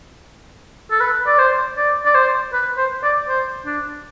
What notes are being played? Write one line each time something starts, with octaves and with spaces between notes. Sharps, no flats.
A4
B4
D5
C5
D5
D5
C5
B4
C5
D5
C5
D4